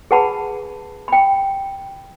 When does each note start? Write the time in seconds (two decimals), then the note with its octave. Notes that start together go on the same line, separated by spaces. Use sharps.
0.11 G#4 B4 F#5 A5 B5
1.08 G5 B5